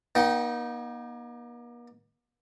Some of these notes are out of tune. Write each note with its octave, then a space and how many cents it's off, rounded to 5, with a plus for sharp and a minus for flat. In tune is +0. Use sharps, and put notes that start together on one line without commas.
A#3 +45 D#4 +0 G5 -20